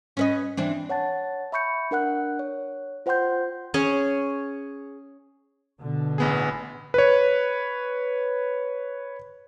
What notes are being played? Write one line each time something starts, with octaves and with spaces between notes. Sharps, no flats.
C#4 B4 D#5
E3 C4 D4
C#5 F#5 A5 A6
E5 B5 C#6 G6 C#7
D4 A#4 F#5 F#6
C#5
F4 C5 F#5 G5 C6 G6
C#4 G#4 C#5
B2 D3
A1 B3 G#4
B4 C#5